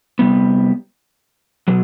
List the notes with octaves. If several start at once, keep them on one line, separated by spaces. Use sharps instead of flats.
C3 G3 B3
B2 F#3